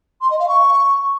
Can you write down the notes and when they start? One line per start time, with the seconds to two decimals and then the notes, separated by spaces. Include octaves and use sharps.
0.21 C6
0.30 D#5
0.39 F5
0.48 C#6